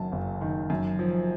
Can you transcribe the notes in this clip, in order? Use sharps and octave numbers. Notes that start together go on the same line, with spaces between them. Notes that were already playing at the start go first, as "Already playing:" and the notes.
Already playing: F#1 F#2 D#3 F#3 A5
F#1
D#3
F#2
F3